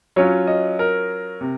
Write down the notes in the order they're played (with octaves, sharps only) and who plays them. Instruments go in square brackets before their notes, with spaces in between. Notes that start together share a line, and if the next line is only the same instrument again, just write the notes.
[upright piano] F#3 C#4 F4 [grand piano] C#5
[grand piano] D#5
A#4
[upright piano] C3